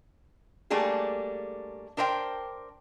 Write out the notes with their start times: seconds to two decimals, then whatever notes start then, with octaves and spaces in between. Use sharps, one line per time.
0.70 G3 A3 A#3 D4 G#4
1.97 D4 A#4 C5 D#5 G5